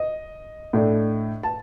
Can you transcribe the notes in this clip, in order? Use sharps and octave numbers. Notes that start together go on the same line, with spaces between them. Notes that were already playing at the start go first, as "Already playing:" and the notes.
Already playing: D#5
A2 A3 D4
A5